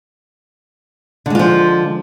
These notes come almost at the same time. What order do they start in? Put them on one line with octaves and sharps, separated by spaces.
D3 G#3 F4 F3